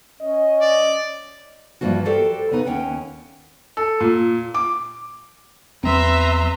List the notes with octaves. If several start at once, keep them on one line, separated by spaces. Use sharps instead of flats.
C#4 D#5
D5
G2 E3 F3 A#3 F#4
F#4 G4 A4 A#4 C5 D5
C#3 B3 D#4 B4
D#2 C#4 F#5 G5
A4
A#2
D6
E2 F#3 C4 B4 E5 A#5 C6